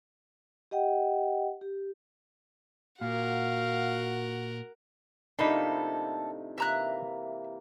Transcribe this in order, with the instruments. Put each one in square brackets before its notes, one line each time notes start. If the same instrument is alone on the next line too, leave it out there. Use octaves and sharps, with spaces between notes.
[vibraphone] G4 D#5 F#5 G5
G4
[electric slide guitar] A#2 [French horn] F#4 [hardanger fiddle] A#4 F#5 [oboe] F5
[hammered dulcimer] A2 C3 F3 [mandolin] A#3 A4 B5 [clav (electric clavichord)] D4 D#4
[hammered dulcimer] C3 E3 A#3 [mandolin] E5 A#5 F#6